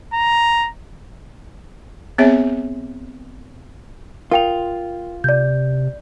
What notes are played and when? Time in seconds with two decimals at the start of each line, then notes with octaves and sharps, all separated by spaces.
0.14 A#5
2.18 B3 C4 G#4 C#5 E5 G#5
4.32 F4 A#4 G5 F7
5.24 C3 D5 G6